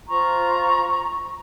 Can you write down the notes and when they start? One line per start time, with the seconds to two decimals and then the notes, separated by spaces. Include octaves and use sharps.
0.09 F4 C5 A#5 C#6